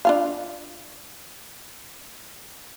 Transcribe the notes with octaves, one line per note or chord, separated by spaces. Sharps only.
D4 F4 F5